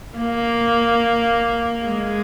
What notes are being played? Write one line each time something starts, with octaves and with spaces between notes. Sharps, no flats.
A#3
G#3